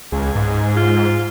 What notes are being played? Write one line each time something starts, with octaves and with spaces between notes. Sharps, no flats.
C#2 G#4
G#2
F4